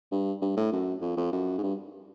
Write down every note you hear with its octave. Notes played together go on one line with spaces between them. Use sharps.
G2
G2
A2
F#2
F2
F2
F#2
G#2
G2